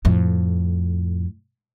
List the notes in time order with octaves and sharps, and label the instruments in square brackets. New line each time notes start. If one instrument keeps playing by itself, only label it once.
[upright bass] F2 A2